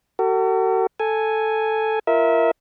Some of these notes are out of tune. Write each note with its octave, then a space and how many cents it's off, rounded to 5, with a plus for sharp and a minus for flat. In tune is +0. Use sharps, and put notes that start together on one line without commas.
F#4 +40 A4 +45
A4 +0 G#5 +0
F4 -25 A#4 +0 E5 -25